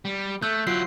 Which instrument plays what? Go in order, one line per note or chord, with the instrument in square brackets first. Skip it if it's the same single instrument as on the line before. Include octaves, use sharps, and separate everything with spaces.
[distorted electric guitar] G3
[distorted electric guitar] A3 [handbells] E6 F#6 G6
[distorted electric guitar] F#3 E4 [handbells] F4 C7